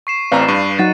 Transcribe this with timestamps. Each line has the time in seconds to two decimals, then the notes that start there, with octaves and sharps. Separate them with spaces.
0.07 C#6 C7 E7
0.32 A1 C4 B4 D5 F5 A#5
0.48 G2 D#7
0.79 F#3 D#4 F#5 A6